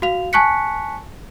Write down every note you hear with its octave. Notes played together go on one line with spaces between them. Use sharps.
F#4 F5 F7
G#5 A5 C#6 F#6 B6 C#7